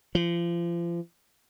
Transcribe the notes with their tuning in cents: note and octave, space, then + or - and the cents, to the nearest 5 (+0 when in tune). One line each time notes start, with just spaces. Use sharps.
F3 -35